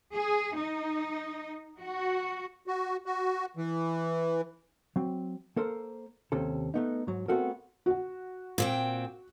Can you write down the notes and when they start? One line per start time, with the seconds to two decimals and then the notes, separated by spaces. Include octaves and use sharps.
0.15 G#4
0.58 D#4
1.79 F#4
2.67 F#4
3.06 F#4
3.57 E3
4.96 F#3 C4
5.56 A#3 A4 A#4 C5
6.32 D#2 C3 C#4 A4
6.74 A3 B3 D#4
7.07 G#2 F#3
7.28 A3 B3 C4 F#4 A4 A#4
7.86 F#4 F#5
8.58 A#2 C4 G5